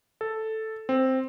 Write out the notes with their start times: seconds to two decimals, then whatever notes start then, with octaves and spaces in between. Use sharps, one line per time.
0.21 A4
0.89 C4